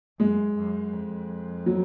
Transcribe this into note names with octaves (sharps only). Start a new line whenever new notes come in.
F#2 G#3
F#2
F2
F#3